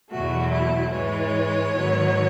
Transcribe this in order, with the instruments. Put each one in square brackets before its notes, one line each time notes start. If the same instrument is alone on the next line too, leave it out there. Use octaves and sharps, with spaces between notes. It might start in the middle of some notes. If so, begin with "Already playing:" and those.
[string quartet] E2 B2 F#3 A3 F#4
E4
G#2 E3 G#3 C#5
G#2 D#3 F#3 B3